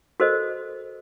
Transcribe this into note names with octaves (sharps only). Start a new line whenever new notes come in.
F#4 A4 A#4 C5 D#5